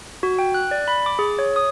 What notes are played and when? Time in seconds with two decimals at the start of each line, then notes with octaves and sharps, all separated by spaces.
0.23 F#4
0.39 G5
0.54 F#6
0.71 D5
0.88 B5
1.06 D6
1.19 G#4
1.39 C#5
1.56 D#6